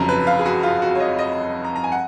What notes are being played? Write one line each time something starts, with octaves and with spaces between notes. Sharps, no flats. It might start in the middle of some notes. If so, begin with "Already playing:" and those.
Already playing: F1 F2 C#3 F#3 A#5
B4
F5
G#4
F#4
F4
F#4
C#5
D#5
D#5
A#5
A#5
G#5
F#5